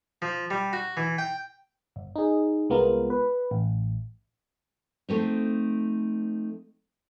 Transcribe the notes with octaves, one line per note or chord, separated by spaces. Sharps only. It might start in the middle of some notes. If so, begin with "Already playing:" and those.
F3
G3
F#4
E3
G5
G1
D#4 G#4
C2 G#3 B3 F4 A#4
B4
A1
F3 A3 C4 D#4